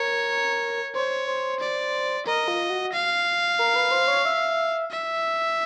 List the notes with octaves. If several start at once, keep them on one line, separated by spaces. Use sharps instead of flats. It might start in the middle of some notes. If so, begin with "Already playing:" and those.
Already playing: A#4 C#5
C5 C#5
C5
D5
A#4 D#5
F4
F#4
F5
A#4
B4
C5
C#5
E5
E5